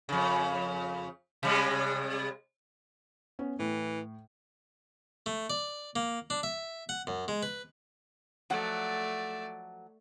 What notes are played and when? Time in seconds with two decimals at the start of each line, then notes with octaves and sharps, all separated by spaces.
0.09 F2 C#3
1.43 C3 G3 G#3
3.39 B3 C#4
3.59 A2 E3
5.26 A3
5.50 D5
5.96 A#3
6.30 D4
6.43 E5
6.89 F#5
7.07 F#2
7.28 G#3
7.43 B4
8.50 F3 F#3 A3 D5 F#5